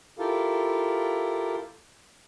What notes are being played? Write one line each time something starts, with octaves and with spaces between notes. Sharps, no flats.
E4 F4 G4 A4 A#4 F5